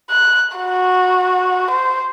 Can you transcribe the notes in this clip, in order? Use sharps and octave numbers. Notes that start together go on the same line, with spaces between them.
F#6
F#4
C5